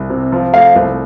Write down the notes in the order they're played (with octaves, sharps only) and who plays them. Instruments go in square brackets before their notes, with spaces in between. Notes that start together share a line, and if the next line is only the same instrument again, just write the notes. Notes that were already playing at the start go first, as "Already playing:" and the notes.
Already playing: [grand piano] C2
C3
F3
[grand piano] A3 [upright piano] F5
[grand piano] C2